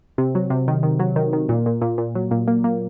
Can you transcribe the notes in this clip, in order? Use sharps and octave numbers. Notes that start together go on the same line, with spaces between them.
C3
F#3
C3
D#3
D#3
F#3
D#3
D#3
A#2
A#2
A#2
A#2
F#3
A#2
A#3
A#3